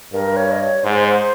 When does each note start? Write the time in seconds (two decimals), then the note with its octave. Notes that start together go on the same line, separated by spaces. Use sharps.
0.13 G2 A#4
0.36 C#5
0.52 D#5
0.60 C#5
0.84 G#2 C5